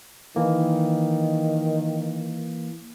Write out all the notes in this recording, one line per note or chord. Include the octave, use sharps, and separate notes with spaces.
D#3 E3 A#3